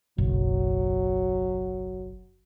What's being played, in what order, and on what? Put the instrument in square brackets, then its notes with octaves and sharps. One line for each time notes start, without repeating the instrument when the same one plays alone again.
[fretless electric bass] F#1 B1 [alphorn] F#3